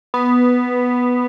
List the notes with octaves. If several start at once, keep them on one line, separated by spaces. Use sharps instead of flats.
B3